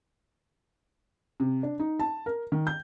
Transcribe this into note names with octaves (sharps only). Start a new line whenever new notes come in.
C3
D4
D#4
A5
A#4
D#3
G6